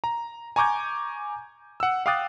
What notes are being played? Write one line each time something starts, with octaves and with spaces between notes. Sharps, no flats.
A#5
G#5 A#5 C#6 D6 G6 G#6
F#5 E6
F5 G5 D6 D#6 F#6 A6